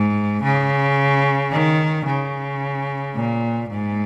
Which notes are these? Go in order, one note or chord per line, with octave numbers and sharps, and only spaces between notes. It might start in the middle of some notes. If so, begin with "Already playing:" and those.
Already playing: G#2
C#3
D#3
C#3
A#2
G#2